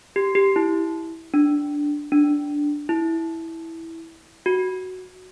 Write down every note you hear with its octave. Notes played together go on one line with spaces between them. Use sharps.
G4
G4
E4
D4
D4
E4
F#4